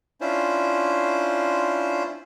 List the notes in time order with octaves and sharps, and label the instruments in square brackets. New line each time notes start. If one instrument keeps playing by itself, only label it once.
[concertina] C#4 D4 E4 F4 C5